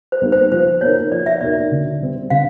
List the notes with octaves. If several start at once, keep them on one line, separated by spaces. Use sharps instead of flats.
C5
G3 A#3 D#4
C5
F3 C5
A#3 D#4 F#4 A#4 C#5
F3 D5
E5
A#3 D#4 F#4 A#4 D5
D3
G3 C4
D3 F5